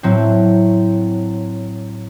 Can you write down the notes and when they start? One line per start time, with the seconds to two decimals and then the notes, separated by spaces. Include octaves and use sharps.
0.03 A2 F#3 C4